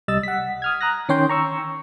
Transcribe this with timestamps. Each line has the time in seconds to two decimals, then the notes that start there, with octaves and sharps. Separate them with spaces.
0.08 C2 G3 D#5 E6 A6
0.23 F#5 B6
0.62 D#6 F6 G#6
0.81 A#5 D#6 F#6 A#6
1.09 D#3 C#4 C#5 G5 C6 G6
1.29 A#5 C#6 E6